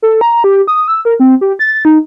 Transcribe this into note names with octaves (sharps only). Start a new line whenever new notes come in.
A4
A#5
G4
D#6
E6
A#4
C4
G4
A6
D#4